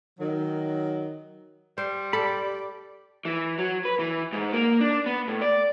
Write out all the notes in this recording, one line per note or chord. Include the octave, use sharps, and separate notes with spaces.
D#3 F#3
G3 C5
G4 A4 D5 B5
E3
F#3
B4
E3
G#2
A#3
D4
B3
A2
D5